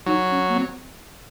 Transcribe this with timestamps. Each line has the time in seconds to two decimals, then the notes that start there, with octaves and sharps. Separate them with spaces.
0.06 F#3 D#4
0.31 C#4
0.49 A#3
0.56 C4